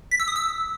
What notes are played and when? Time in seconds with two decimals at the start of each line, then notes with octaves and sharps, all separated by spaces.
0.11 B6
0.20 E6
0.28 D#6
0.36 E6